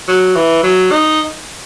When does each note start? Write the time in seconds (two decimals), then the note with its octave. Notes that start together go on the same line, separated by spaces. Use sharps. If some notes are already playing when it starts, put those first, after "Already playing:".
0.08 F#3
0.36 E3
0.63 F#3
0.91 D#4